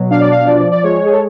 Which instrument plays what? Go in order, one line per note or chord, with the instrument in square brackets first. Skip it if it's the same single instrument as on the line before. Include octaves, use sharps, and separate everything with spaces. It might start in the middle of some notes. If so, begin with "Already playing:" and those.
Already playing: [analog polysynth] B2 F#3
D4 F5
D5
F5
F3 D5
D5
G#3 C#5
G#4
A4